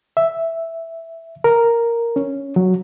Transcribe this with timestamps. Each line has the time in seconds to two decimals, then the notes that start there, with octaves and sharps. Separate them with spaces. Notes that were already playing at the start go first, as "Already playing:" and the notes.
0.17 E5
1.44 A#4
2.16 C#4
2.56 F#3